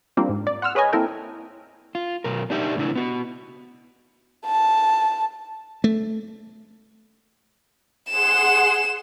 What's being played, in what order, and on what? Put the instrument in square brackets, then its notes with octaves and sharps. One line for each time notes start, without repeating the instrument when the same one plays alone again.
[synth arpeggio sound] F3 G3 A#3 C4 D4
G#2
D5
F#5 C6 E6 F6
G#4 B4 C#5 D#5 G#5
A#3 C4 E4 A4 A#4 G5
[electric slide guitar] F4
F#2 B2 A#4
D4 D#4 G4 E5
A2 C#3 D4 E4
B3 F#4
[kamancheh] A5
[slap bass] A3
[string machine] G#4 F#5 C6 [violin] E7